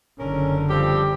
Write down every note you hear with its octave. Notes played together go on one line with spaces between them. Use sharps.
F#1 D3 C#4 A#4
F3 G3 C4 G4